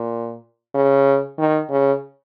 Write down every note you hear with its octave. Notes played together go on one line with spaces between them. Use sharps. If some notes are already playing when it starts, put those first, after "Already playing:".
Already playing: A#2
C#3
D#3
C#3